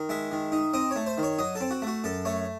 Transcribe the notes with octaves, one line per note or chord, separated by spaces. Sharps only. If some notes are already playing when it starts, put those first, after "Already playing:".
Already playing: D#3
G#3 E5
D#3
D#4
C4 D#5
A3 C#5
C5
D#3
C#5
F#3 D#5
A4
C4
F#4
A3 F#4
F#2 A4
A3 C#5